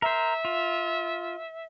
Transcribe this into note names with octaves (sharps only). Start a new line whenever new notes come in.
A#4 C5 E5
F4